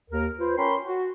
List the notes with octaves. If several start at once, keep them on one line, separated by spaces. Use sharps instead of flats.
D#2 A#4
F4 B4 C5
C#4 A#4 C#5 G5 B5 C6
F#4